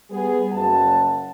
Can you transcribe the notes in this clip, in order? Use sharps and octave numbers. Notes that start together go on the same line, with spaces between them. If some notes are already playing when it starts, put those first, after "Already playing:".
G3 B3 G#4
F#1 F#5 A5